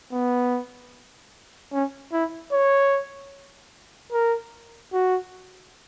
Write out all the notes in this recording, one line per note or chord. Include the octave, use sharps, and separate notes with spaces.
B3
C#4
E4
C#5
A#4
F#4